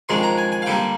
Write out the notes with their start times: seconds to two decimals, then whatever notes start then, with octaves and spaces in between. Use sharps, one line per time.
0.09 F2 D#3 G#3 D4 C6
0.23 A#5
0.38 G#5
0.52 G#5
0.62 F5
0.66 D3 G3 A#3 G5